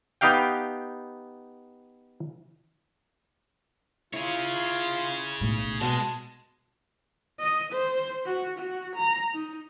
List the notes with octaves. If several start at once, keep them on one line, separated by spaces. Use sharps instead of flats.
B3 D#4 G4 F5 G5
E4 F4 G#4 C#5
B1 A2
B2 G#3 A5
D#5
C5
F#4
F#4
A#5
D#4